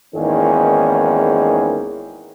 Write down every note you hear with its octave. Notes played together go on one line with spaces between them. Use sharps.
G#1 E2 D#3 A#3 C#4 G#4